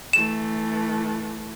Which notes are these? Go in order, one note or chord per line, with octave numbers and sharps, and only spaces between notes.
E3 A3 E7